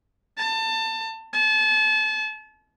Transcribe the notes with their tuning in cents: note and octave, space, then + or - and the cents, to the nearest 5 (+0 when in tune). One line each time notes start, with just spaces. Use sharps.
A5 +25
A5 -35